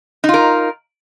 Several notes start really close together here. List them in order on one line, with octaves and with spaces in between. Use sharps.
D#4 F4 A#4